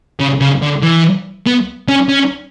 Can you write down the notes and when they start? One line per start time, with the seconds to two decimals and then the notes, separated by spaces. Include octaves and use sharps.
0.20 C#3
0.41 C#3
0.62 D3
0.83 E3
1.46 B3
1.89 C#4
2.09 C#4